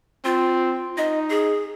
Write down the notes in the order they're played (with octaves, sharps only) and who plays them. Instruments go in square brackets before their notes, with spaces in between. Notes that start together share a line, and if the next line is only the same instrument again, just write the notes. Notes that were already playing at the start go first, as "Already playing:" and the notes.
[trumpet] C4 [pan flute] F4
[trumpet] D#4 [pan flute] D#5
[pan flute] G#4